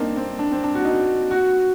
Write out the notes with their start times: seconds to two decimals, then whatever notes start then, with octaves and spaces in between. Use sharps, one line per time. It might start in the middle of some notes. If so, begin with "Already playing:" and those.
Already playing: A#3 C4 D4 D#4
0.16 C4
0.39 D4
0.51 C4
0.63 D4
0.75 F#4
0.85 D#4
1.31 F#4